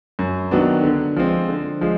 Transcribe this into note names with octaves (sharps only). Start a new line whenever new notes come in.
F#2
D#3 F#3 B3 D4
D3
F3 G#3 C4
D3
F3 G#3